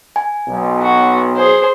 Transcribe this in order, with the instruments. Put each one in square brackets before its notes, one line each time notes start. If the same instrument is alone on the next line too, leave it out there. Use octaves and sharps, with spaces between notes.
[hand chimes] G#5
[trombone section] B1
[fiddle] F#4
G#4 C5